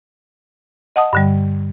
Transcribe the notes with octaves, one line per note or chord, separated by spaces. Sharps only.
D#5 F#5 A5 D#6
G2 D3 G3